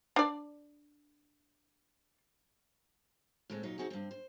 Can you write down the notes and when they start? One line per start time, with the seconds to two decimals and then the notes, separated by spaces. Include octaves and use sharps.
0.16 D4 D5
3.50 A2 G#3 C4
3.63 A#2 F#3 D#4
3.78 C4 D4 D#4 F#4 G#4
3.90 G2 C4
4.11 C5